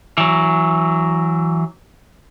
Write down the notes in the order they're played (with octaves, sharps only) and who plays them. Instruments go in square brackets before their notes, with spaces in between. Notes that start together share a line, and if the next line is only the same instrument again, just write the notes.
[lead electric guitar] E3 F#3